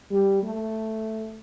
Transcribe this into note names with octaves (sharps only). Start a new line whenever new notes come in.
G3
A3